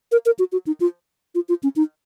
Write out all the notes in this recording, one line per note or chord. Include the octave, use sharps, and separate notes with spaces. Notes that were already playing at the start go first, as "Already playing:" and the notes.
A#4
A#4
F#4
F#4
D#4
F4
F4
F4
C#4
D#4